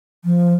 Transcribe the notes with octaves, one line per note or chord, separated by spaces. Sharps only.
F3